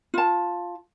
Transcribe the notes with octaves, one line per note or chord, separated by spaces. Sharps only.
F4 A5